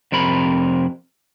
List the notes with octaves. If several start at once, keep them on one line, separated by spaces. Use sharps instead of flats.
F2 C3 A#4 B5